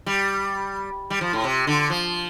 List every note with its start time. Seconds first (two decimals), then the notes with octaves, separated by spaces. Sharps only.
0.06 G3
1.10 G3
1.21 F3
1.33 A2
1.44 C3
1.67 D3
1.90 F3